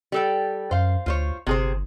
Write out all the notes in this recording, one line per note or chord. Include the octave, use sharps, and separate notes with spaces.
G3 A4 G5
F#2 C5 F5
D2 F4 C5 C#5
G1 C3 G#4 C5